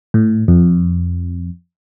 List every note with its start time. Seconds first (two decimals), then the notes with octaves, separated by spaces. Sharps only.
0.14 A2
0.48 F2